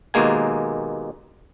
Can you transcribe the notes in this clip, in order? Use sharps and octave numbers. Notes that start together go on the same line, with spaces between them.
D#2 B2 G#3 A#3 G#5